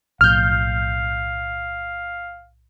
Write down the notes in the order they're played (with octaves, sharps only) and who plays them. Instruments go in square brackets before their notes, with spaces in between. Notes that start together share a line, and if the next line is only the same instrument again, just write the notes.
[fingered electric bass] B1 A2 F3 [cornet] F5 [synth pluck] F6 G6